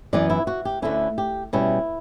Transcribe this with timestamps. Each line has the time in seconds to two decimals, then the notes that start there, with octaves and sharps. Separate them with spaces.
0.13 F#2 E3 B3 D5
0.30 E4
0.47 F#4
0.65 G4
0.82 D2 D3 A3 C#4 E4
1.18 G4
1.53 B2 G3 C#4 E4